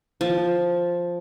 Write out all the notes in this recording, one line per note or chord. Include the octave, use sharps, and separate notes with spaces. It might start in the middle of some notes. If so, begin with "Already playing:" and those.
F3